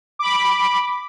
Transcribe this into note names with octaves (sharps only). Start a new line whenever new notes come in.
B5 D6